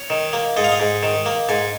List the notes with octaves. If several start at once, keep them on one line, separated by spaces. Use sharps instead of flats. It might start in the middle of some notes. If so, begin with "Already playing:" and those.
Already playing: C#5
D#3
A#3
G#2 D#5
F5
D#5
G#2
D#3
A#3
G#2 G#5